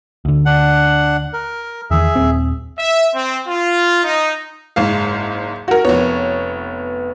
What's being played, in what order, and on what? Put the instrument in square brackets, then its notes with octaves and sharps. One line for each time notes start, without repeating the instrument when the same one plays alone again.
[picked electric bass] D2 D3
[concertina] D4 F#5
A#4
[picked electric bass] E2 D#3 [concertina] G#4 E5
[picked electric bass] D#1 C4
[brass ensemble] E5
C4
F4
D#4
[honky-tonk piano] F#1 G#2 F5
[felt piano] F#4 A#4
[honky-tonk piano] F1 C#5 [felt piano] B3